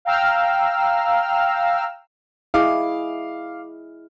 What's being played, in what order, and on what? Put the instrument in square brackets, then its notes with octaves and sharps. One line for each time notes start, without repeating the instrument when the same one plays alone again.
[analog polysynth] F5 G5 A#5 E6 F6
[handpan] E4 G#4 D#5 [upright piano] F5 D6